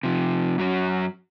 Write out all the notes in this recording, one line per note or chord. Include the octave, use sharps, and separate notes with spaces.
C3 F3
F#2 F#3 C#4